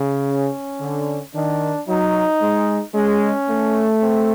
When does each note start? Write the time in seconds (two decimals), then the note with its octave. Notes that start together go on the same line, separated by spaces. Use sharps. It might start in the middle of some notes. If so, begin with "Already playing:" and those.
Already playing: C#3
0.28 C#4
0.81 D3
1.35 D#3 D4
1.88 F#3 D#4
2.42 G#3
2.95 G#3 C#4
3.49 A3
4.02 C4